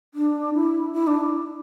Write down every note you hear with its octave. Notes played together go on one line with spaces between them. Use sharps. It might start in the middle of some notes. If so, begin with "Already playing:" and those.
D4
E4
E4
D4